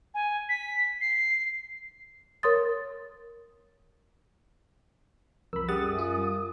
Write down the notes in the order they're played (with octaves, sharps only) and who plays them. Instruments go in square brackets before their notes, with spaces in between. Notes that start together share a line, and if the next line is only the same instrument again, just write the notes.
[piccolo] G#5
B6
C7
[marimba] A#4 C#5 C6 D#6 A6
[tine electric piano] C2 E6 [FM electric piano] F2 B5 [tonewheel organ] A#4
[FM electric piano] G3 F#5 A6 [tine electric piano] C#4 G4 G#4 [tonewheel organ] D#6
[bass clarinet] F#2
[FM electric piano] F4
[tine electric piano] G3